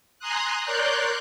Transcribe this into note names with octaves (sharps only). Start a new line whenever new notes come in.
G#5 A#5 C6 D#6 F#6
A#4 C#5 D5 C6 F#6 G6